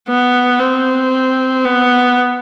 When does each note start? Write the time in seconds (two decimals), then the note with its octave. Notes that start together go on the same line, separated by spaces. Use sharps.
0.09 B3
0.60 C4
1.64 B3